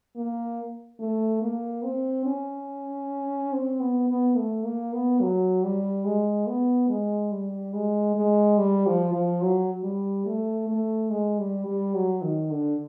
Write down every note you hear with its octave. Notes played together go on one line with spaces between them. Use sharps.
A#3
A3
A#3
C4
C#4
C4
B3
B3
A3
A#3
B3
F#3
G3
G#3
B3
G#3
G3
G#3
G#3
G3
F3
F3
F#3
G3
A3
A3
G#3
G3
G3
F#3
D#3
D3